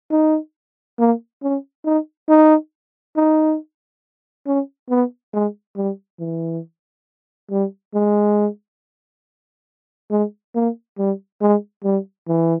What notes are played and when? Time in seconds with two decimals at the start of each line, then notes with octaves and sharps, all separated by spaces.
0.11 D#4
0.99 A#3
1.43 C#4
1.85 D#4
2.29 D#4
3.17 D#4
4.46 C#4
4.90 B3
5.33 G#3
5.76 G3
6.19 E3
7.51 G3
7.94 G#3
10.11 G#3
10.55 A#3
10.98 G3
11.42 G#3
11.84 G3
12.28 E3